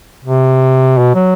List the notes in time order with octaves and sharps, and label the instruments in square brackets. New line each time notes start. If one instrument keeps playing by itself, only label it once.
[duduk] C3
B2
F#3